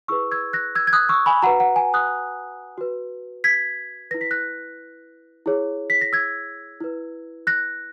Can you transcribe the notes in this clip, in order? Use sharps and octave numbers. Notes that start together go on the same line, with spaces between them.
E4 G#4 B4 C#6 E6
E6 G#6
F#6 A#6
E6 G#6
G#6
D#6 F#6
C#6 E6
G#5 B5
F#4 B4 F#5 A#5
F#5
G#5
D#6 F#6
F#4 B4
G#6 B6
E4 B4 A#6
B6
F#6 A#6
E4 G#4 C#5
B6
A#6
E6 G#6
E4 B4
F#6 A#6